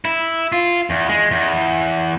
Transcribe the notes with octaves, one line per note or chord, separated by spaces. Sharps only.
E4
F4
E2
G#3
E2